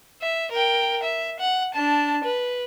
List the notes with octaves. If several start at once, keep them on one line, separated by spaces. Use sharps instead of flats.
E5
A#4 G5
E5
F#5
D4 A5
B4